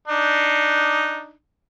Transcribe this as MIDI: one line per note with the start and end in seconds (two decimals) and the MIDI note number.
0.07 1.33 62
0.07 1.33 63